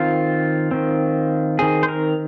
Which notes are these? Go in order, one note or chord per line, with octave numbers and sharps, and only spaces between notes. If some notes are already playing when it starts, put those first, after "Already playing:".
Already playing: D#3 C4 F4
D#3 C4
D#3 C4 G#4
C5
A#4